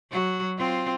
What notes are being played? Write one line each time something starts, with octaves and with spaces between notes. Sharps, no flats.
F#3 F#4
C4 F4